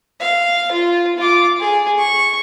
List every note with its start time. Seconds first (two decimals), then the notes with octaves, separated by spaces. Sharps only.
0.20 F5
0.72 F4
1.18 F4 D6
1.60 G#4
1.99 C#6